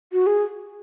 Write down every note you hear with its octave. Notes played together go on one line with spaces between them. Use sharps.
F#4
G#4